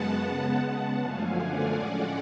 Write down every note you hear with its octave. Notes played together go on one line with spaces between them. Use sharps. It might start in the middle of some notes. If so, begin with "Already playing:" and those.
Already playing: F#2 C#3 G#3 B3 F#5 A5
C#3 G#3 B3
F#2 D3 F3 A3 F5 G#5
D5 F#5
A2 G#3 C#4